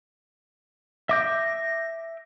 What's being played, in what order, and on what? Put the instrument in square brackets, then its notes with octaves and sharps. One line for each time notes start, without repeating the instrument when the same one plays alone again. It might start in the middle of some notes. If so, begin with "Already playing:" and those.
[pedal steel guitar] E5 D6 G6 [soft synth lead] A#6